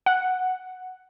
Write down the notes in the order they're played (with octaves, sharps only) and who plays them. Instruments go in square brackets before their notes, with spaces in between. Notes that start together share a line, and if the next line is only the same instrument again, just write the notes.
[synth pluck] F#5